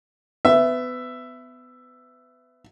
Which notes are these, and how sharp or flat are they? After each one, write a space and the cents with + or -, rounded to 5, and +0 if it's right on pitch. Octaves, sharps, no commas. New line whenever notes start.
B3 +25 E5 +10